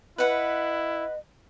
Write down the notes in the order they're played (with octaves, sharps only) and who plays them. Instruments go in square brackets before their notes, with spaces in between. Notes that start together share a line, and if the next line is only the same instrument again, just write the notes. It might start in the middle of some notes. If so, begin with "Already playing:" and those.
[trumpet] E4 [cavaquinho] B4 F#5 [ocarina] D#5